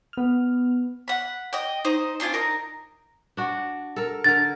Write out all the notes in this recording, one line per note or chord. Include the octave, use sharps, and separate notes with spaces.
B3 F6
F#5 B5
D#5 G5
D#4 C5 D#5
C4 D4 F4 G#5
D#4 A#4
D4 F#4
A4 A#4
D3 A#4 A6